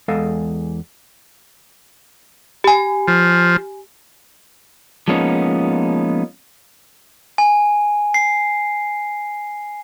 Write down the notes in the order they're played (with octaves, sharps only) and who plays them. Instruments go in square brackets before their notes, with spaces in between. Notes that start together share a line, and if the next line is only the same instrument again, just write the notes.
[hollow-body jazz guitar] E2 G#3 A4 D#5 F5
[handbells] G4 G#5
[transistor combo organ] F3
[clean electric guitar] F3 G#3 A#3 B3 C#4 D#4
[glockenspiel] G#5
C7